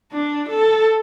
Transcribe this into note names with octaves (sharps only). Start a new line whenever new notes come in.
D4
A4